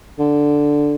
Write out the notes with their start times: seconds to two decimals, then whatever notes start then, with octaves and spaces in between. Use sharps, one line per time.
0.19 D3